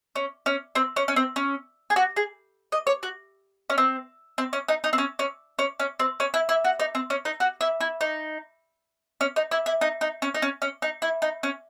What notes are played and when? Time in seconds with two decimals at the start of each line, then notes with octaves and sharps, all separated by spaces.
0.16 C#4
0.46 C#4
0.75 C4
0.96 C#4
1.08 C#4
1.16 C4
1.36 C#4
1.90 G#4
1.96 F#4
2.16 G#4
2.72 D#5
2.87 C#5
3.03 F#4
3.70 C#4
3.78 C4
4.38 C4
4.53 C#4
4.68 D#4
4.84 D#4
4.93 C4
4.98 C#4
5.19 C#4
5.59 C#4
5.80 C#4
6.00 C4
6.20 C#4
6.34 E4
6.49 E4
6.65 F#4
6.80 D#4
6.95 C4
7.10 C#4
7.25 D#4
7.40 F#4
7.61 E4
7.81 E4
8.01 D#4
9.21 C#4
9.36 D#4
9.51 E4
9.66 E4
9.81 D#4
10.01 D#4
10.22 C#4
10.34 D#4
10.42 C#4
10.62 C#4
10.82 D#4
11.02 E4
11.22 D#4
11.43 C#4